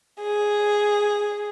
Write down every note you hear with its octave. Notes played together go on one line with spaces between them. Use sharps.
G#4